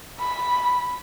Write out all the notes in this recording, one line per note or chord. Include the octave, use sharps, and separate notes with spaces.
B5